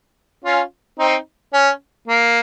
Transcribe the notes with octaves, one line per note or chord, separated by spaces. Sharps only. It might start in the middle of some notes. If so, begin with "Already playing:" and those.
C#4 F4
C4 D#4
C#4
A#3